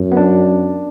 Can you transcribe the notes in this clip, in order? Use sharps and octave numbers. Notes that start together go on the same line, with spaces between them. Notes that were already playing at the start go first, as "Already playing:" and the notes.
Already playing: F#2
B3
D4